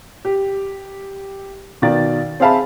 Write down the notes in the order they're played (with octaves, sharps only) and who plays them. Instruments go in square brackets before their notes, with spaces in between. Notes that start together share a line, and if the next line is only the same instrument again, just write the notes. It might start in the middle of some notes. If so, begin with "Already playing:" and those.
[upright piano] G4
B2 D#3 D5 F5 A6
C4 G#4 E5 F5 A5 B5